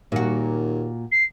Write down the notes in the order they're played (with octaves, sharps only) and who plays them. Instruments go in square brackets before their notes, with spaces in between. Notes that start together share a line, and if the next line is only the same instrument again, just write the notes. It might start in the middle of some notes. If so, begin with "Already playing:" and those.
[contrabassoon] D#2 [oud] A#2 F#4
[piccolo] C7